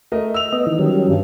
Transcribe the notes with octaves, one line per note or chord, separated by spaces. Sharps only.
A3 A#4 D#5
E6 F7
B3 D#5
D#3 E3
D#3 F#3 G3 C#4
G2